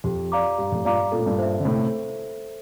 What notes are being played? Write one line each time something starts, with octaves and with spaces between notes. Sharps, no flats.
F2 G4
D5 F5 A#5 D6
G2 G4
F2 A2
G2 A#2 D5 F5 A#5 D6
A#2 A4
A2
G2 A#2
C5 E5
D3
A2 C3 A4